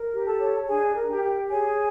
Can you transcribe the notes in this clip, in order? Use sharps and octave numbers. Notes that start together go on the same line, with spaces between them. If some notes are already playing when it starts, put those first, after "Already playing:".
Already playing: A#4
G4
A4 A5
C#5
D4 G#4 G#5
A#4
G4 G5
G4
G#4 C#5 G#5